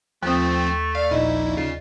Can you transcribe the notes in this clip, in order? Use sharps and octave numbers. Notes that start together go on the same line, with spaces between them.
D#2 F3 A3 C4 D#6
D5 F5
A#1 D#4 E4 D#5
C#3 F4